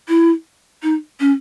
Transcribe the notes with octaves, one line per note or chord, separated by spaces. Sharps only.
E4
D#4
C#4